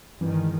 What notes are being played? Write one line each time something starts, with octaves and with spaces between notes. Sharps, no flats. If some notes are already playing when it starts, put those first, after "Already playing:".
G2 D#3 E3 G#3